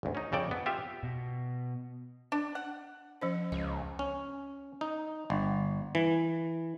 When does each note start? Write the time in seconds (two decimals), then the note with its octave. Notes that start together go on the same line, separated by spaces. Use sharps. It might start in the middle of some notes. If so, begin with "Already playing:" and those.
0.03 G#1 D2
0.15 C#4 D#4
0.32 F2 C#3 A4 D5 G5
0.51 B3
0.66 F4 G4 E5
1.03 B2
2.32 D4
2.55 F#5
3.21 F3 C#4 C5
3.52 C#2 D#5
3.99 C#4
4.81 D#4
5.30 G1
5.95 E3